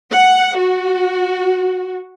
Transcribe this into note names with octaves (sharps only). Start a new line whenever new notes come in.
F#5
F#4